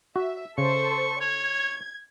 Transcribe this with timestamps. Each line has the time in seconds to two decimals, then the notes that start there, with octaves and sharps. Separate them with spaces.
0.16 F#4 E5
0.58 C#3 A4 C5 C#6
1.21 C#5 G#6